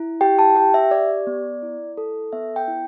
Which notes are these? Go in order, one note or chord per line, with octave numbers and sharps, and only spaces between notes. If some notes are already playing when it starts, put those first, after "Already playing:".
Already playing: E4
G4 G5
A5
G4 G5
E5
G4 D5
B3
E4
A4
B3 E5
G5
E4